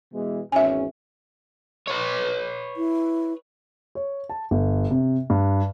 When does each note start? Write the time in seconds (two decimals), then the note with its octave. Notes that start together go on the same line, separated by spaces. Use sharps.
0.12 B2 E3 G#3
0.52 G#1 E2 C#4 E5 G#5
1.87 B4 C#5
2.77 E4
3.95 C#5
4.29 A5
4.51 G1
4.90 C3
5.30 G2